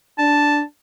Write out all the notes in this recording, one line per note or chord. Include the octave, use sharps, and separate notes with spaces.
D4 A5